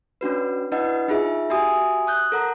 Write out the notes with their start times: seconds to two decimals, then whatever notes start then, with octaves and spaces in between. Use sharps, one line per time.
0.21 C#4 D4 F#4 B4
0.72 D4 E4 B4 D#5 F#5
1.08 D#4 F4 G#4 E5
1.50 F#4 G4 E5 G#5 D#6
2.07 D#6 F#6 G6
2.32 A4 A#4 F#5 A#5